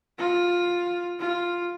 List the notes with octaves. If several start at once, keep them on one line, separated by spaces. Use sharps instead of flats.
F4
F4